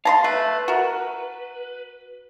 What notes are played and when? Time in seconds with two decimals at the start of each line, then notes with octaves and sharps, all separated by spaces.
0.05 F5 A5 A#5 C6
0.24 A3 B4
0.68 F#4 A#4